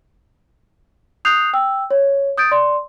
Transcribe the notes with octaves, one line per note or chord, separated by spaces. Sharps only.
D#6 F#6 G6 C7 F7
G5 E6
C#5
D#6 G6 A6 D7
D5 C6